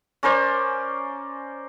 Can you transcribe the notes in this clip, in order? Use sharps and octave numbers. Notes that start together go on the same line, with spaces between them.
C#4 A#4 C5 D5